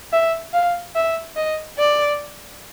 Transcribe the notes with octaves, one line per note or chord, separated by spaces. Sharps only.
E5
F5
E5
D#5
D5